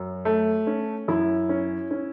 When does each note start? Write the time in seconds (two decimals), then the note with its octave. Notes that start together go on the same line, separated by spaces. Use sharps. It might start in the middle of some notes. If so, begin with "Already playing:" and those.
Already playing: F#2
0.25 A3
0.67 C#4
1.08 F#2 E4
1.49 C#4
1.91 C#4